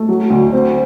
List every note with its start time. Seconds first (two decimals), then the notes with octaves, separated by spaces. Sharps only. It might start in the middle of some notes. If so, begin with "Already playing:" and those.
Already playing: A3
0.09 F#3
0.30 D2
0.53 C4